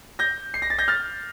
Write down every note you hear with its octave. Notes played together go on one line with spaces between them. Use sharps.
G6 A#6
C7
A#6
A6
G6 A#6
F6 A6